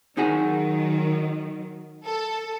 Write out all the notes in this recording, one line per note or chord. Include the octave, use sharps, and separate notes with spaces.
D#3 F#3 D#4 F#4 G#4
A4